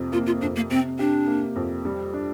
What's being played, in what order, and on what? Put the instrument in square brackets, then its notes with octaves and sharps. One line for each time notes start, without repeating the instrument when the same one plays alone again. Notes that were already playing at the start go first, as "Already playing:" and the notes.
Already playing: [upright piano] F2 C3
[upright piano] A#3 [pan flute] F4
[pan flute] F4
[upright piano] F2 [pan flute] D4
[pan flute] A#3
[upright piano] C3 [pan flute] C4
[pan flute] D4 [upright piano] G4
[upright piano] A#3
F2
G3
D4